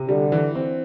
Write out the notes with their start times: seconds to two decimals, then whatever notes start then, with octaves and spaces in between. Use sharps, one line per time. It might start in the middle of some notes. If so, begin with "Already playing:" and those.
Already playing: C3
0.08 D3 G3
0.32 E3
0.55 C4